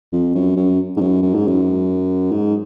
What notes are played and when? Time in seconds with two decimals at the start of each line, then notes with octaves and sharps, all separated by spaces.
0.13 F2
0.35 F#2
0.56 F#2
0.97 G#2
1.01 F#2
1.22 F#2
1.35 G#2
1.48 F#2
2.31 G#2